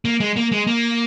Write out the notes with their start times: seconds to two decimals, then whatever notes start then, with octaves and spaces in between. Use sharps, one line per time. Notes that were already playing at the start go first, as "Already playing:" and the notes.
0.05 A#3
0.20 G#3
0.36 A#3
0.52 G#3
0.67 A#3